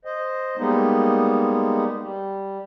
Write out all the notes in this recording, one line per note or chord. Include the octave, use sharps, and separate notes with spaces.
C5 D#5
G3 G#3 A#3 B3 D#4
G3